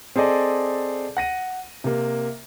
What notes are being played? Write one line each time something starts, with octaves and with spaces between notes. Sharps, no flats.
C4 G#4 A4 D5 D#5
F#5 A#6 D#7
C3 A#3